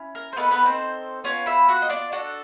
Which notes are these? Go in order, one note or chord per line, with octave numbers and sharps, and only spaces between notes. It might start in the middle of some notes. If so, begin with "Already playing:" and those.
Already playing: C#4 E4
A#4
C5
A#3 B3 D#4 A4 B4
B3 B4
C4 C5
B3 C#4 F4 C#5
E4 E5
F#4 F#5
D#5
D4 D5
D4 F#4 A4